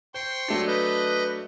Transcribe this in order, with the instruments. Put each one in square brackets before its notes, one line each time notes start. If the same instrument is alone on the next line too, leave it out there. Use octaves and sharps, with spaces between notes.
[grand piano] C5 [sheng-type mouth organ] G5 C6 C#6
[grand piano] F#3 A3 D4
[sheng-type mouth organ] B4 D#5 G6